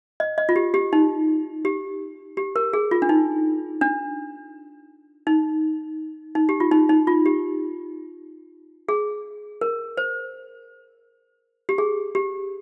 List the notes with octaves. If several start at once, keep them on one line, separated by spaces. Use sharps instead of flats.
D#5
D#5
F4
G4
G4
D#4
G4
G4
A#4
G#4
F4
D4
D#4
D4
D#4
D#4
G4
F4
D#4
D#4
F4
G4
G#4
A#4
C5
G4
G#4
G4